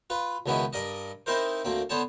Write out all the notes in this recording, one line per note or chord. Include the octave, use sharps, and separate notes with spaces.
F4 B4
C#2 B2 D#3 B3 C#4 E4
G2 A#4 D5 D#5
C4 D#4 E4 A#4 C5
D2 A#3 C4
D3 B3 C5 C#5 A5